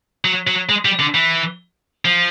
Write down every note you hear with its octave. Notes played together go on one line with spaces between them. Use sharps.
F#3
F#3
G#3
G3
D3
E3
F3